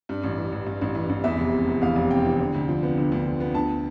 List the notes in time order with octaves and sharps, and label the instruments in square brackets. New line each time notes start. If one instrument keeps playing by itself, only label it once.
[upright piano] G2
A1
E3
A1
G2
A1
E3
A1
E2 E5
F1
C3
E3
E2 F5
F1
C3 G5
E3
D3
D2
F3
B3
D3
D2
F3
B3
D2 A5